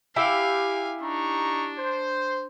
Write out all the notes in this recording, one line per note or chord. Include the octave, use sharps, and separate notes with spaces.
E4 G4 E5 F5 G#5
D4 D#4 A#5 C#6
C5